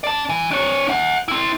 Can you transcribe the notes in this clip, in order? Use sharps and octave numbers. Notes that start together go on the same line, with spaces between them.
D5 A5
E3
D4 C#5
E5 F#5
C4 E4